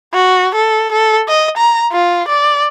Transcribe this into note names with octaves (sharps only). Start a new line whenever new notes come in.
F#4
A4
A4
D#5
A#5
F4
D5